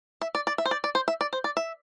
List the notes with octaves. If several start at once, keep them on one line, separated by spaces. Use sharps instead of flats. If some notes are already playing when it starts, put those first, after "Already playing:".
E5
D5
D5
E5
C5
D5
D5
C5
E5
D5
C5
D5
E5